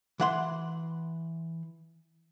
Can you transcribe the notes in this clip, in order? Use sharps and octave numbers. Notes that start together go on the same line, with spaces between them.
E3 F#5 C6